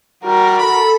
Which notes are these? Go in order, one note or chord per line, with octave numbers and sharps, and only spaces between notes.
G3 F#4 A#4
A4 B5